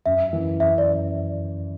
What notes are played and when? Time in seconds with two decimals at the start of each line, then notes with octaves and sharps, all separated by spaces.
0.06 F#2 E5
0.33 E3
0.60 F#2 E5
0.78 D5